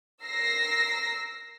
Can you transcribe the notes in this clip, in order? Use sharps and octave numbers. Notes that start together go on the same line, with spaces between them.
A#4 E6 A#6 C7